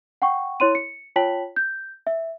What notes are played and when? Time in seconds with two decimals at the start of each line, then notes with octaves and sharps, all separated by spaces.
0.22 F#5 G5 C#6
0.60 E4 C#5 C6 D#7
0.75 C#7
1.16 F4 C#5 G5 A5 B6 F#7
1.56 G6
2.07 E5